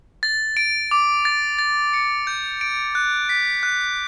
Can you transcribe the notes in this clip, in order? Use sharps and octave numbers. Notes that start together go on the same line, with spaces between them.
A6
D7
D6
A6
A6
C#7
G6
D7
F#6
B6
F#6